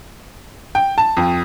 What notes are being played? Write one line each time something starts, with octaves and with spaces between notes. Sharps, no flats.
G5
A5
F2